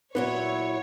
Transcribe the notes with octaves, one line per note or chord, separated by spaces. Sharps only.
A#2 F#3 B3 E4 C#5